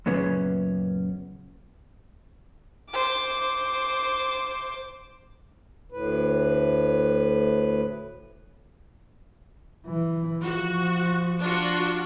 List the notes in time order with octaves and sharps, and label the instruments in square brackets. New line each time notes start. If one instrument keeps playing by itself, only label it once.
[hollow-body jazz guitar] F#2 A#2 C#3 B3 C#4
[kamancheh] C5 D6
[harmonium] D2 A2 B4
[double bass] E3
[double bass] F3 [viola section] F#4
[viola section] D4 F4 F#4